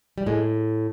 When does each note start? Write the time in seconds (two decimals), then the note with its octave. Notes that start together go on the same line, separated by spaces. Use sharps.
0.18 G3
0.26 A2 G#3